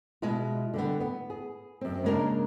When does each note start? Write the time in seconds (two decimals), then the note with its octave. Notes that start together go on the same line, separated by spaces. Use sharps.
0.22 B2 G#3 E4 F4
0.74 D3 G3 B3
1.00 B3
1.30 G#4
1.81 F#2 C4
2.04 C#3 G#3 A#3 D4 A#4